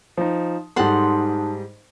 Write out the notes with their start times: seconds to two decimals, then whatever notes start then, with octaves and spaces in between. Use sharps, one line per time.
0.17 F3 D#4
0.76 G#2 G3 D#4 A4 F#5 A5 C6